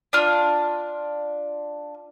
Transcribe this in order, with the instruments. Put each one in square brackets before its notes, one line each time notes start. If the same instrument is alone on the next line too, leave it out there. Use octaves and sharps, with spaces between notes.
[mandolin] D4 F4